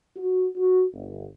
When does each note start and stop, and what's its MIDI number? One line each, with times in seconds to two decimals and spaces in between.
0.16 0.47 66
0.56 0.84 66
0.94 1.26 31